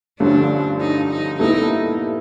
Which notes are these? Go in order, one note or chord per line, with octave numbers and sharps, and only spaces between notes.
G2 D3 F3 A3 C#4 D4
D#4
D#4
A#2 G3 B3 D#4 E4 A4